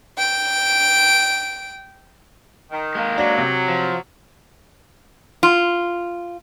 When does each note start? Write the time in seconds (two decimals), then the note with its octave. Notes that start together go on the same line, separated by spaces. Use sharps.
0.18 G5 D7
2.71 D#3
2.95 G#3 A#3
3.18 F#3 D4
3.38 C3
3.68 F3
5.43 F4